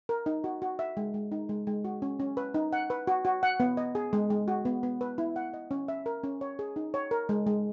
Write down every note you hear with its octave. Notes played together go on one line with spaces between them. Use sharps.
A#4
D#4
F#4
F#4
E5
G#3
G#3
D#4
G#3
G#3
F#4
C#4
C#4
B4
D#4
F#5
B4
F#4
F#4
F#5
B3
D#5
G#4
G#3
G#3
F#4
B3
B3
B4
E4
F#5
D#5
C#4
E5
A#4
C#4
C#5
G#4
D#4
C#5
A#4
G#3
G#3